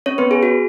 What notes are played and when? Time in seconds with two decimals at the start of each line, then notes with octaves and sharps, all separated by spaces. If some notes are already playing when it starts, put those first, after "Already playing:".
0.06 C#4 C#5
0.18 B3 B4
0.31 G#4
0.43 F#4